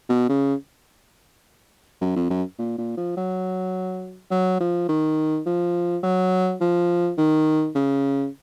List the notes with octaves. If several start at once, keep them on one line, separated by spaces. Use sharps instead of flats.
B2
C#3
F#2
F2
F#2
A#2
A#2
F3
F#3
F#3
F3
D#3
F3
F#3
F3
D#3
C#3